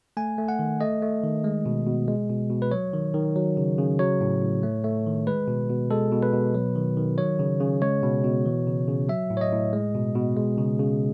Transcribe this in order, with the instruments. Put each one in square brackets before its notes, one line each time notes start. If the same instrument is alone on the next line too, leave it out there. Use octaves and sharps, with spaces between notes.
[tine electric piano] A3 G#5
A3
F#5
D#3
A3 D#5
A3
D#3
G#3
B2
B2
G#3
B2
B2
B4
F#3 C#5
D#3
D#3
F#3
C#3
C#3
F#3 C#5
A2
A2
A3
A3
D#3
G#3 B4
B2
B2
G#3 A4
B2
B4
B2
F#3
D#3
D#3
F#3 C#5
C#3
C#3
G#3 C#5
B2
B2
E3
C#3
C#3
F#3 E5
A2
C#5
D#5
A2
G#3
B2
B2
G#3
C#3
C#3